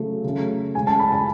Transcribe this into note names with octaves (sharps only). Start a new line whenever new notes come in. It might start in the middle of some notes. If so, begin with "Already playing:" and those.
Already playing: C#3 F#3 A3
C#3 F#3 A3
C#3 G#3 G#5
A5
B5
A5